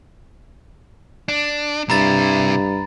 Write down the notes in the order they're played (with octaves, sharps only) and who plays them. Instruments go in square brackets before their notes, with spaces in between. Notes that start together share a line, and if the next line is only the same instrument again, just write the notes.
[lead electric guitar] D4
[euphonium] G2 [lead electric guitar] C3 E4 [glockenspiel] A#5 B5 A6